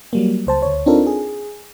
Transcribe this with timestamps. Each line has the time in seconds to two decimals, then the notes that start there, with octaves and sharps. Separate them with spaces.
0.13 F#3 G3 A#3
0.47 C#2 C5 A5
0.62 D2 C#5
0.86 C4 D4 D#4 F4 A4 A#4
1.07 G#4